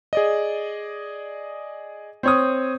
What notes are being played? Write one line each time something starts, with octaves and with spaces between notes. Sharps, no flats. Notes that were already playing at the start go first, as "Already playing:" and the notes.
G#4 D5 D#5
C4 C#5 D#6